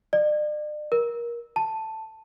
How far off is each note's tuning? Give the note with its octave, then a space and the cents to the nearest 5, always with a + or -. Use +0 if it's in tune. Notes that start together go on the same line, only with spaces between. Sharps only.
D5 +40
A#4 +20
A5 +5